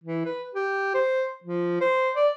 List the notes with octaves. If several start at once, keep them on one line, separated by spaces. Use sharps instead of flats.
E3
B4
G4
C5
F3
C5
D5